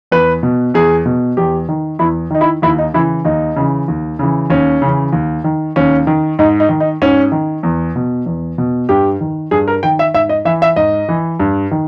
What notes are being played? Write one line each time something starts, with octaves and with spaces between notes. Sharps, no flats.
E2 B4
B2
E2 G#4
B2
E2 G4
D#3
E2 E4
D#3 D#4
E4
D#2 E4
D#4
C#3 E3 E4
D#2 D#4
C#3 E3
D#2
C#3 E3
D#2 C#4
C#3 E3
D#2
D#3
D#2 C#4
D#3
G#2 D#4
D#4
D#3
D#4
G#2 C#4
D#3
E2
B2
E2
B2
G2 G4
D#3
G2 G#4
A#4
D#3 G5
E5
G#2 E5
D#5
E3 E5
E5
G#2 D#5
E3
G2
D#3